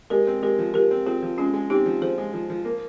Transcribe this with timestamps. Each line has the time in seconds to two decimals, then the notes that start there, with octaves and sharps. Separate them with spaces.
0.10 G#3 G4 A#4
0.27 C4
0.42 G#3 G4 A#4
0.59 F3
0.74 F3 G4 A#4
0.91 C4
1.06 C4 F4 G#4
1.22 F3
1.38 G#3 C#4 F4
1.54 G#3
1.70 C4 D#4 G4
1.86 F3
2.02 F3 G#4 C5
2.18 G#3
2.34 F3
2.50 F3
2.65 A#3